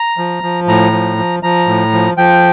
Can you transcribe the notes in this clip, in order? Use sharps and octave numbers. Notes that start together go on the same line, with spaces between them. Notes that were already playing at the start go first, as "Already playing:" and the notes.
Already playing: A#5
F3
F3
A2 A#5
F3
F3
F3 A#5
A2
F3
F3 G5